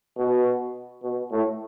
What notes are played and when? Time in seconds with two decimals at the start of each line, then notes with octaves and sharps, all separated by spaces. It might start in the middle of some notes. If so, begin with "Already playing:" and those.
0.17 B2
1.03 B2
1.31 A2